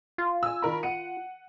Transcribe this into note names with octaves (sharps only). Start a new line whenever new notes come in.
F4
G#5 E6
D#3 A#4 B5
F#5 C#7 D#7